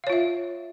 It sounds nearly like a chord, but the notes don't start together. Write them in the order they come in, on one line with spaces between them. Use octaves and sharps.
F5 C#5 F4 E5